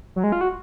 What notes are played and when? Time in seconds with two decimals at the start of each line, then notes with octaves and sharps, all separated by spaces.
0.16 F#3
0.24 G#3
0.32 F4
0.41 F#4